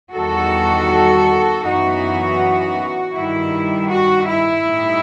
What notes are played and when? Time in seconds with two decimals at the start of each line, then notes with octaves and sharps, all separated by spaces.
0.13 E2 D#3 G3 F#4 A4
1.63 F#2 E3 B3 D#4 F#4
3.13 G2 D#3 G3 E4
3.89 F#4
4.26 E4
4.64 A2 G3 D#4